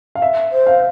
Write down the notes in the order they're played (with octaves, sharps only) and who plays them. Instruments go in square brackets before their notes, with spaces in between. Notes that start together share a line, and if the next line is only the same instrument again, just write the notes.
[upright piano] F5
E5
[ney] C5
[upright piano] F5